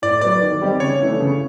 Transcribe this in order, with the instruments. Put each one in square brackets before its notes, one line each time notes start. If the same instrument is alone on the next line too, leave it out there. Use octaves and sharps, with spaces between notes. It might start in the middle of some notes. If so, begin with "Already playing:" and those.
[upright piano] A2 [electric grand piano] D5
[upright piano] F#3 B3 [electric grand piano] D5
[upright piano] D#3
G3 C4 D#4 G4
[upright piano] C#3 [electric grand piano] C#5
[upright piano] E3 A3 D4
C#3